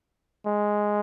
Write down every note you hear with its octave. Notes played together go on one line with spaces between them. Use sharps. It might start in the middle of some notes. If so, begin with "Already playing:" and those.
G#3